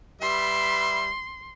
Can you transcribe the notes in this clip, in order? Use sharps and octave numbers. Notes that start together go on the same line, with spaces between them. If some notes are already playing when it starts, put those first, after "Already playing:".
G3 B4 E5 C6